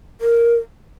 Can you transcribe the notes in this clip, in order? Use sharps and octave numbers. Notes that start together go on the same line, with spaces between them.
A#4